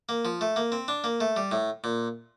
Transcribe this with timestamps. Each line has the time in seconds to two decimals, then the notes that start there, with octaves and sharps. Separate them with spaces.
0.09 A#3
0.25 F3
0.41 A3
0.56 A#3
0.72 C4
0.88 D4
1.04 A#3
1.20 A3
1.36 G3
1.51 A2
1.84 A#2